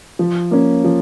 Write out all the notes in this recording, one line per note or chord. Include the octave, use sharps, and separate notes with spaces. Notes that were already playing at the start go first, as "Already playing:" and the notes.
F3
A#3 C#4
F3